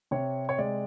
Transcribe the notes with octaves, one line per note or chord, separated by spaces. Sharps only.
C3 C#5
C#5
G#3 D5